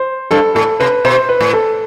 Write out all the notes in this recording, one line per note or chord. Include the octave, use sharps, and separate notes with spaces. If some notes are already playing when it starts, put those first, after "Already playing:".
Already playing: C5
G2 A4
A2 A4
C3 B4
B2 C5
B4
A2
A4